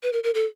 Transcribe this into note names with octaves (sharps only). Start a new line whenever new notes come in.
B4
A#4
A#4
A4